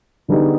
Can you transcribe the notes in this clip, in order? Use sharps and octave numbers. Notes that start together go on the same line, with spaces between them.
D3 G3 B3 D#4 G#4